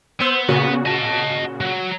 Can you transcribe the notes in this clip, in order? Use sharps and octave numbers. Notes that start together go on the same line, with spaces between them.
B3 C5 E6
A#2 C#3 F#4
D#5 A5
F#3